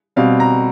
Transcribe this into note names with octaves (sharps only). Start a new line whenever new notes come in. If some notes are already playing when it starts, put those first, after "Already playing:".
B2 G3 C4 F5
A#5